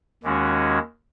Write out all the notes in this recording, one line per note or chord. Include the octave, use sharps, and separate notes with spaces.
D#2 D#3 G#3 C#4 F#4